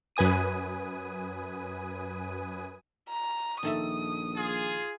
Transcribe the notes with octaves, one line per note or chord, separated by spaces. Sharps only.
F#2 B4 G#5 D#6 D#7
A#5
A#1 D#3 A4 E5 D#6
F4 G#4